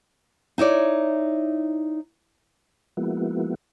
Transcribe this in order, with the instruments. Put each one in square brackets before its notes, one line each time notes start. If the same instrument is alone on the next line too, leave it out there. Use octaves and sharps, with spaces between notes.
[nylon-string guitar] D#4 E4 C#5 D5
[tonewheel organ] F3 G#3 A#3 B3 E4 F#4